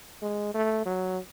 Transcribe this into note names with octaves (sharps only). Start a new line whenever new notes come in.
G#3
A3
F#3